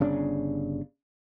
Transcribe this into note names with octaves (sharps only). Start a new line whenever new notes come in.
G1 C#3 D4